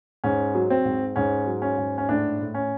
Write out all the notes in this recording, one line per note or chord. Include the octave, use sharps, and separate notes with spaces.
G#2 C#4
F#3
C4
G#2
G#2 C#4
F#3
C#4
G#2
C#4
A2 D4
A2
C#4